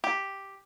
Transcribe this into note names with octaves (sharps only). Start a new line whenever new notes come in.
G4